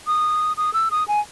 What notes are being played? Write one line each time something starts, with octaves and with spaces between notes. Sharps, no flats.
D#6
D#6
E6
D#6
G#5